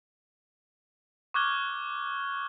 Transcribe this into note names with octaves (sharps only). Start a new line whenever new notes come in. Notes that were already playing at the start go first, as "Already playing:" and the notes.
C#6 D6 F6 F#6 G#6 G7